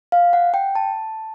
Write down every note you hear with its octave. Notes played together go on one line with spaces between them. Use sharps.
F5
F#5
G5
A5